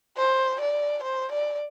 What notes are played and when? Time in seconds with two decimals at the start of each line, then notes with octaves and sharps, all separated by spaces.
0.17 C5
0.60 D5
1.03 C5
1.32 D5